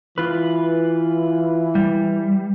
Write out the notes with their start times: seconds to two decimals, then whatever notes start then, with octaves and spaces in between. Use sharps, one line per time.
0.18 E3 F4 B4
1.75 G3